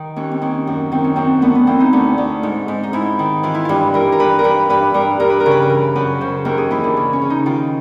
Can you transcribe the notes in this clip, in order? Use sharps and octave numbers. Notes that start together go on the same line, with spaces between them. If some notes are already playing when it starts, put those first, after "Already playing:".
Already playing: D#3
D#2 C#4
C4
D#3 C#4
F#2
D#3 C4
C#4
F#2 C4
D2 B3
B3
E3 C4
D#4
D2
D2
G#2
G#2
D#4
G#2 E4
D#3
E3 F4
E4
G2 F4
E3 A#4
A#4
G2 B4
A#4
G2 B4
G2 B4
G2 A#4
G2 A#4
B4
A#4
C#3
B4
A#4
E3
F#2 B4
C#3 C5
D#2 A#4
G#4
E3 E4
D4
C#3
C#4
C#3
D#4
D#3 F4